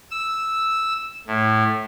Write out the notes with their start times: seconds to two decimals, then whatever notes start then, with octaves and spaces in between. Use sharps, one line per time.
0.11 E6
1.27 A2